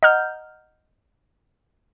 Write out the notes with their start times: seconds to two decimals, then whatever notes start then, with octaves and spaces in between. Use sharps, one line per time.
0.03 D#5 F#5 A#5 F6 G6